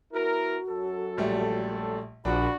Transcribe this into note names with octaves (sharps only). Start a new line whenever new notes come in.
B3 E4 F#4 A#4
F#2 F#3 A4
A#1 G3 A3
A#1 D4 F#4 B5